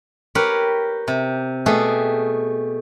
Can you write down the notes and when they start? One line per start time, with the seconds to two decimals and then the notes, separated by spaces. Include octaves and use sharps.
0.35 G4 A#4 B4 C#5
1.08 C3
1.66 B2 A3 G4 G#4